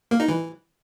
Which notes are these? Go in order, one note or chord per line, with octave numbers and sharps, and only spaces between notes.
A#3
D#4
E3